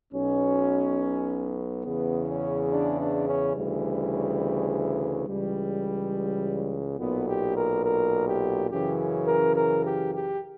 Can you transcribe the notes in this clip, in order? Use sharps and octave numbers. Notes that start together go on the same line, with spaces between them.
B1 B2 C#4
E2 C#3 E3 B3
C#4
D4
D4
C#4
D2 C#3 E3 G3
C#2 C#3 E3 G3
B1 A#2 B3
G4
A#4
A#4
G4
F#2 C#3 E3 G4
A#4
A#4
G4
G4